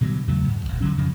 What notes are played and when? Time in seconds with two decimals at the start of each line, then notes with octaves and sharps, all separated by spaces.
0.01 B2 D3 F#3 G3
0.27 E2 C#3 F#3 A3
0.48 G#2
0.65 D#1 E2
0.81 D3 F3 F#3 C#4
0.97 F2 C#3 F3 G#3